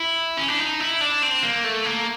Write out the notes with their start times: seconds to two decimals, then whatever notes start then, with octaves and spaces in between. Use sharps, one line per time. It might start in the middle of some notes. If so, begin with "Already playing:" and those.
Already playing: E4
0.38 C#4
0.48 D4
0.59 D#4
0.80 E4
1.01 D4
1.22 C4
1.43 A#3
1.65 A3
1.86 A#3